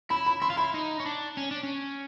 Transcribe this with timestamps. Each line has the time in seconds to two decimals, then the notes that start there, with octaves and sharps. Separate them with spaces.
0.10 E4 B5
0.26 B5
0.42 E4 C6
0.50 F4
0.57 E4 B5
0.74 D#4
1.00 C#4
1.06 D4
1.37 C#4
1.51 D4
1.63 C#4